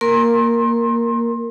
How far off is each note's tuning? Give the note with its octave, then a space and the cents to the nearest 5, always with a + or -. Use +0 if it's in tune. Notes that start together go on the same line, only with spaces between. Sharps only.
A#3 +0 A#4 +0 C6 +30